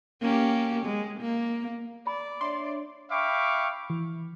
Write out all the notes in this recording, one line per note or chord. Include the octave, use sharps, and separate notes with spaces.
A#3 C#4 G4
G#3
A#3
D5 B5
D4 C#5 E5 C6
E5 F5 G5 B5 C#6 D6
E3